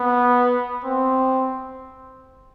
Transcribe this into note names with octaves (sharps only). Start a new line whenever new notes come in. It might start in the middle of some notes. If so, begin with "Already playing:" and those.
Already playing: B3
C4